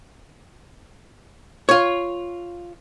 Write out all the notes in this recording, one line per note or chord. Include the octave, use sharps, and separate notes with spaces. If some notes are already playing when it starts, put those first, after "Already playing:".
F4 C#5